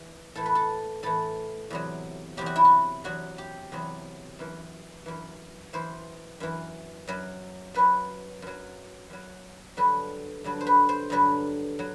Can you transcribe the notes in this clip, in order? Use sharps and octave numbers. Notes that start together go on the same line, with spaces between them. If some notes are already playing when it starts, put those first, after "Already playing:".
Already playing: E3
A2 E3 A4
B4
A4
A2 E3 A4
E2 C3 F#3
E2 C3 F#3 G4
F#4
E4
F#4
E2 C3 F#3 F#4
G4
E2 C3 F#3
F#2 E3
F#2 E3
F#2 E3 C5
F#2 E3
F#2 F#3
F#2 F#3 B4
F#2 F#3
F#2 F#3
G2 D3 F#3 B4
G2 D3 F#3
C5
B4
C5
G2 D3 F#3 B4
F#3